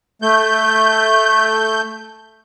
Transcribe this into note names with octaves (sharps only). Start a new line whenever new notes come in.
A3 G6